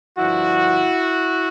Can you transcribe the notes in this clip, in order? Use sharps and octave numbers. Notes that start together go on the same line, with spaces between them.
G2 D3 F3 E4 F#4